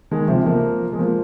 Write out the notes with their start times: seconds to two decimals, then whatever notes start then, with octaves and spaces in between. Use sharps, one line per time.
0.11 D#3 G#3
0.28 C3 F3
0.46 F3 A#3
0.93 G#3
0.99 F3 A#3